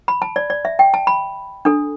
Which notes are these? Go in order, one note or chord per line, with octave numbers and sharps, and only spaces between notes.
B5
A5
D5
D5
E5
G5
A5
B5
D4 A4